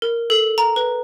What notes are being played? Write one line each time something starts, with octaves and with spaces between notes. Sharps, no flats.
A#4
A4
A#5
B4